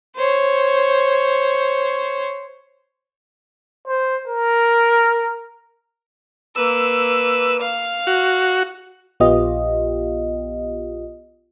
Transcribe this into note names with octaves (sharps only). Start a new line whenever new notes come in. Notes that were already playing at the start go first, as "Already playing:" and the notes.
C5 C#5
C5
A#4
A#3 B4 E6
F5
F#4
A#1 B3 F4 G4 D#5